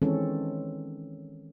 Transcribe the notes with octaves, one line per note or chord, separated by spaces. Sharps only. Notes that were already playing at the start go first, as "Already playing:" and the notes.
D#3 E3 G#3 C4 C#4 A4